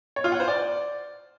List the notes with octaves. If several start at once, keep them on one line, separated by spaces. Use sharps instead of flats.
C#5
F4
F#5
C5
D5